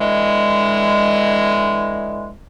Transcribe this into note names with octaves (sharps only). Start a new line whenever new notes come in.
D3 E3 G#3